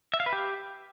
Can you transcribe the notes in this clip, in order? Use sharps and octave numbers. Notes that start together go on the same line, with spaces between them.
E5
F5
B4
G4